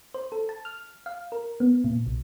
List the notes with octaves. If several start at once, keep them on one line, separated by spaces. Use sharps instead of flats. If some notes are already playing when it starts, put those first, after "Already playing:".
C5
A4
A5
F6
F5
A#4
B3
A#2
B1